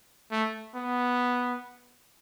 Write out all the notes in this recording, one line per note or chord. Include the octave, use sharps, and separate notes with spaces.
A3
B3